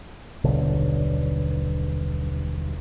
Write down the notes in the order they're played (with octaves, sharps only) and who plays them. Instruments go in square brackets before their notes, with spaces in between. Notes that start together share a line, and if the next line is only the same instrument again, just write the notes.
[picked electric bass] D#1 B1 D3